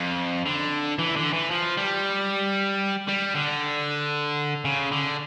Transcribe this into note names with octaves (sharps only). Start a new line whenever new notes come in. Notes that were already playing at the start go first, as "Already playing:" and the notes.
Already playing: F2
D3
E3
D3
E3
F3
G3
G3
D3
C#3
D3